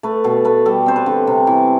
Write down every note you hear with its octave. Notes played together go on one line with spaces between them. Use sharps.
A3 B4
B2 A4
A3 B4
G3 A4
C4 C5
B4
D3
C3
E3